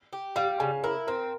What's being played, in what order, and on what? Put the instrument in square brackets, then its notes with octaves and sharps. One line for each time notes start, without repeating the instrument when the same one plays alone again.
[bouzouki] G4
[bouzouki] G3 [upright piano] F5
[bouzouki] C#3 [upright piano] G#5
[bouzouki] E4 [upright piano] A#4
[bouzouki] C4 [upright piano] A#4